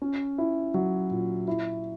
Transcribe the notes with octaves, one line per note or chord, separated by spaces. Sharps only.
C#4
E4
F#3
A#2
E4